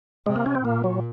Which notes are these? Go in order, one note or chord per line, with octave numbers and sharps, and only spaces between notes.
C3 G#3
A#3
C#4
C4
A#2 A#3
F#3